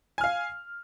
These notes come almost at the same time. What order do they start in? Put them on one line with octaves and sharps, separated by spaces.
G#5 F6 F5